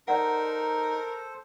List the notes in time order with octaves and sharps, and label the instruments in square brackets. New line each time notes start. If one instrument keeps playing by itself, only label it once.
[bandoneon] D#4 [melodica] A4 C5 [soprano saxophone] A#4 [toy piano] D5 F#5